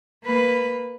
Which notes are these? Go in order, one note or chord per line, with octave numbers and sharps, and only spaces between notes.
A#3 B4